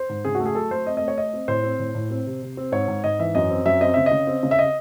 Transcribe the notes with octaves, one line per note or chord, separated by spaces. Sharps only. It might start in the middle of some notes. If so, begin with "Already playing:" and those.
Already playing: C5
G#2
C#3 G#4
A3 F#4
G#4
F#3 A4
A3 C5
C4 D#5
A3 D#5
C#5
A3 D#5
C4
A2 C5
C4
A2
A2
C4
C3
C3
C4
G#2 C#5
G#2
G#2 D#5
E3 E5
F#2 D#5
C4
F#2 E5
C4 D#5
C#3 E5
D#5
C#3
C4
C#3
E5
D#5